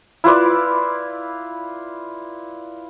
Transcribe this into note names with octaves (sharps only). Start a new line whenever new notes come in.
E4 F4 B4 D5